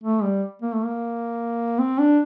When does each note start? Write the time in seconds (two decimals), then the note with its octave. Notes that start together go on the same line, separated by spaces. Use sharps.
0.03 A3
0.23 G3
0.62 A#3
0.73 A3
0.84 A#3
1.79 C4
1.99 D4